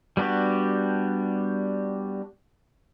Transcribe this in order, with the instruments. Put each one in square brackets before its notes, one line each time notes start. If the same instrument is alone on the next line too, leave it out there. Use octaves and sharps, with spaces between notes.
[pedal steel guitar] G3 B3 D4 F#4 G4